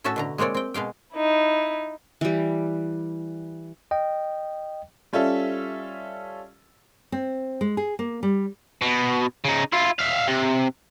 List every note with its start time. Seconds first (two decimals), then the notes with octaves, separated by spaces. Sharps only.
0.04 A2 C#4 F#4 A4 E5 A5
0.16 B2 D3 A#5
0.38 G#3 A#3 C4 C#5 D5
0.54 C4 G5
0.74 B2 G#3 F5 G5
1.13 D#4 E4
2.21 E3 G3
3.91 D#5 G5
5.13 G3 C#4 F4 A4 E5
7.12 C4
7.61 G#3
7.77 G#4
7.99 A#3
8.23 G3
8.82 B2
9.45 C#3 D#4
9.73 E4 F4
9.99 E5 F5
10.28 C3